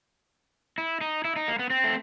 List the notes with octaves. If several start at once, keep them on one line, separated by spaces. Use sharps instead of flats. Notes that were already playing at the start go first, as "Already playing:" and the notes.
E4
D#4
E4
D#4
A#3
B3
C4
A3